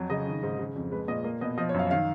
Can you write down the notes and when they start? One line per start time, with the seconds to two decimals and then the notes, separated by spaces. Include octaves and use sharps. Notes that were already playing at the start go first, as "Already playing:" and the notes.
Already playing: F2 F#3
0.10 C#3 D#5
0.27 D#3
0.43 G#2
0.59 C#3
0.76 F2
0.91 G#3 B4
1.08 A#2 D#5
1.24 A#3
1.41 B2 D#5
1.58 F3 D#5
1.69 C#5
1.74 F#2 F5
1.91 D#3 F5